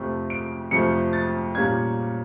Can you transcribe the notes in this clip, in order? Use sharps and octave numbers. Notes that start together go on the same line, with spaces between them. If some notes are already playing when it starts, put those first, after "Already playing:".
Already playing: F2 C3 F3 A3
D7
F2 C3 F3 A3 C#7
A6
A#2 G3 A#3 C#4 G#6